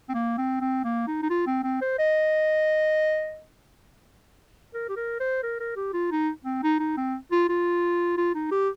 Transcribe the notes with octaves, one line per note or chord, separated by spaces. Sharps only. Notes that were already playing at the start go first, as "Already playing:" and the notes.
C4
A#3
C4
C4
A#3
D#4
D#4
F4
C4
C4
C5
D#5
A#4
G4
A#4
C5
A#4
A#4
G4
F4
D#4
C4
D#4
D#4
C4
F4
F4
F4
D#4
G4